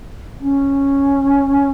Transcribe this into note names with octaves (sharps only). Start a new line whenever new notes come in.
C#4